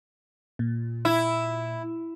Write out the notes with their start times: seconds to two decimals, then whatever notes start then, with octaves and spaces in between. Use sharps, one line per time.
0.59 A#2
1.05 E4